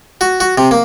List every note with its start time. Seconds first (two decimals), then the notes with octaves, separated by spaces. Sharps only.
0.21 F#4
0.40 F#4
0.58 C3
0.71 A#3